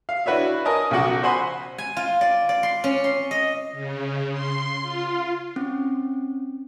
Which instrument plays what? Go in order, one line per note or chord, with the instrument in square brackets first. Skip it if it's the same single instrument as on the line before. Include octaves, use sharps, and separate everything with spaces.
[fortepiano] F5
D4 E4 F#4 B4 C#5 E5
A#4 C#5 D#5 G#5 A5
B1 C#3 F3 F#4 F#5 D6
C5 F#5 G#5 B5 C6
[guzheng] G#5
F4
D5
D5
C6
C#4
C6
D#5
[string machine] C#3
C6
F4
[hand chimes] C4 C#4